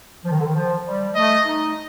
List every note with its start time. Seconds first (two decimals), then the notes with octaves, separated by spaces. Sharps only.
0.24 F3
0.31 D#3
0.38 D3
0.45 D#3
0.54 F3
0.85 G3
1.15 A3 D#5
1.46 D#4